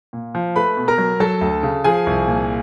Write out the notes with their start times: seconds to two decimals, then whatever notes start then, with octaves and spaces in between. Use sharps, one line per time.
0.13 A#2
0.35 F3
0.56 A3 B4 B5
0.77 B2
0.88 A#4 A#5
0.98 F#3
1.20 F#3 A4 A5
1.41 D2
1.63 C#3
1.84 F3 G#4 G#5
2.06 C2
2.27 A#2